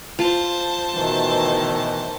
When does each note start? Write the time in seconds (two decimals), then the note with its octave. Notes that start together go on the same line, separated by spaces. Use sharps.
0.19 F4 C5 A5
0.94 B2 D#3 E3 A3